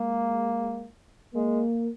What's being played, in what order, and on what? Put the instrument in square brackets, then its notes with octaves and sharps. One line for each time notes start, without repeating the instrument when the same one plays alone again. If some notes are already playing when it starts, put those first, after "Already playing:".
Already playing: [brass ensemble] G#3 [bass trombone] A#3
[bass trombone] G#3 [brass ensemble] A#3